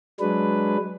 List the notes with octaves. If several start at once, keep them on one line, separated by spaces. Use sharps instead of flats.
F#3 G#3 D4 B4